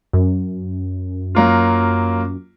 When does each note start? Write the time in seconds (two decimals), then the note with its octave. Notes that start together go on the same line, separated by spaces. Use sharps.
0.13 F#2
1.35 F#3 A#3 F4